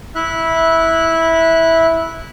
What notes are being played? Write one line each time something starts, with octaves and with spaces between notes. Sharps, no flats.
E4 E5 F#6